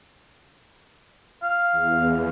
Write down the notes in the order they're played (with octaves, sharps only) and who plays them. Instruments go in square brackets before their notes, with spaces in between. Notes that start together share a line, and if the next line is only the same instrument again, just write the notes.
[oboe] F5
[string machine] E2